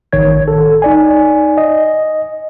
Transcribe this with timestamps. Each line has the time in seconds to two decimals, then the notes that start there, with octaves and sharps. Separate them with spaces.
0.13 A1 D#3 C#5 G#6
0.48 A4
0.82 D#4 D5 G#5
1.58 D#5